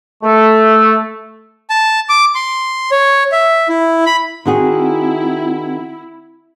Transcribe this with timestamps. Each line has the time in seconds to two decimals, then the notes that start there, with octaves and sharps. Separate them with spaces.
0.23 A3
1.70 A5
2.09 D6
2.35 C6
2.92 C#5
3.32 E5
3.69 E4
4.06 B5
4.46 D#3 C4 E4 F#4 G#4 F#5